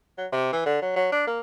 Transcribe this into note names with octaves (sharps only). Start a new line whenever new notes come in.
F#3
C3
E3
D3
F#3
F#3
D4
A#3